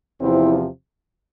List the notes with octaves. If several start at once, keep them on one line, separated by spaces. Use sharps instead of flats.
E2 C3 F3 C4 E4